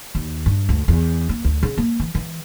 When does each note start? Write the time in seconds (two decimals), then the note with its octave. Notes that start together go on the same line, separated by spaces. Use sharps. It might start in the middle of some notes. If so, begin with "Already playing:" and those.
0.15 D#2
0.46 G2
0.69 D2
0.88 E2
1.29 A#3
1.44 D2
1.63 C#3
1.78 A#3
2.00 E3
2.15 E3